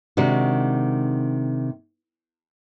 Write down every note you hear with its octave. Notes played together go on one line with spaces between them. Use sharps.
C3 D#3 G#3 D4 F#4